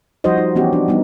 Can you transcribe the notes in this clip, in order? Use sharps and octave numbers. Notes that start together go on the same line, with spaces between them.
F3 G3 D#4 F#4 C5 D#5
D#4
E3 B3 C#4 F#4 G4
D4
G3 B3 D#4